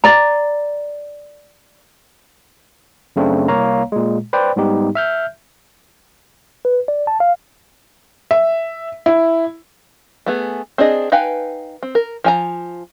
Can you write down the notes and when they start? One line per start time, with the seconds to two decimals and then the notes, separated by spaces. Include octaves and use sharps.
0.04 D5 A#5
3.16 F#2 C#3 A3 C4 D4
3.48 C2 A#3 C#5 F5 A#5
3.92 A#2 G#3
4.33 B4 C5 D5 G5
4.56 G#2 G3 B3 D#4 G4
4.95 E5 F6 G6
6.65 B4
6.88 D5
7.07 A5
7.20 F5
8.31 E5
9.06 E4
10.26 A3 B3 G#4
10.78 C4 D4 G#4 D#5
11.12 D#4 B4 F5 G5 G#5
11.83 C4
11.95 A#4
12.24 F3 G#5 A#5